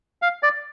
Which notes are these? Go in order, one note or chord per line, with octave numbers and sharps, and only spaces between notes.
F5
D5